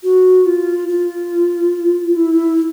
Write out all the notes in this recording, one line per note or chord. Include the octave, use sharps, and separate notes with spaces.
F#4
F4
F4
E4